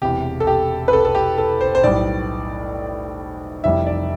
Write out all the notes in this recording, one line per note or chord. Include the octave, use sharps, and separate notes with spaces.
E1 E2 C3 G4
A4
G4
B4
A4
A4
G4
A4
C5
C5
B1 A2 G3 D5
F1 F2 E3 G3 E5
D5